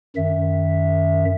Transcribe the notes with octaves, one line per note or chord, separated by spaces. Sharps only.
F#2 D#3 E5